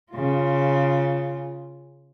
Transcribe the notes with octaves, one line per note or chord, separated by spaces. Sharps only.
C#3 F4